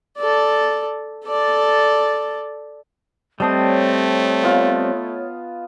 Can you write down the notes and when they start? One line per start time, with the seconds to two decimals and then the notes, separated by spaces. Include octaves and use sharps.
0.18 A4 D5
1.25 A4 D5
3.40 G3 A3 C4 C#5 D#5 A5 D#6
4.42 B3 F4